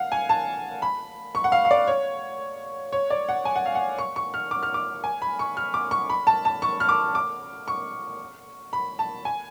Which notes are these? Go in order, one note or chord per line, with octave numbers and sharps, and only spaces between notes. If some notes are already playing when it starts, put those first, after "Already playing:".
Already playing: F5 F#5
G#5
A5
B5
C#6
F#5
F5
F5
D5
C#5
C#5
D5
F#5
G#5
F#5
F5
F#5
C#6
C#6
F6
D6
F6
D6
G#5
B5
C#6
F6
D6
C#6
B5
A5
A5
C#6
F6
D6
D6
C#6
B5
A5
G#5